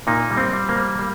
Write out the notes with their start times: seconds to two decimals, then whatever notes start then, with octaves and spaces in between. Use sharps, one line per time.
0.07 A#2 A#3 D#4
0.31 G3
0.37 C4
0.53 G3
0.69 A#3
0.76 G3
0.99 G3